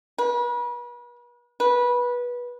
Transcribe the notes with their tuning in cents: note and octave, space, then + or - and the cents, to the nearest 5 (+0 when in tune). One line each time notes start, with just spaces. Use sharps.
B4 -40
B4 -20